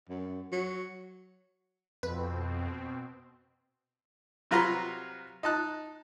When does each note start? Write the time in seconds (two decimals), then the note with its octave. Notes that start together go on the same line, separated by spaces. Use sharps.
0.09 F#2
0.52 F#3
2.03 F2 B2 C4 B4
4.51 C3 F#3 F4 B4 A#5 C6
5.43 D#4 D#5 A5 F#6